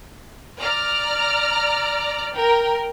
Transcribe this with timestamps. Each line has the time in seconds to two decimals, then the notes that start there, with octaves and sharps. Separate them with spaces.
0.61 D5 A#5 F6
2.35 A#4 G5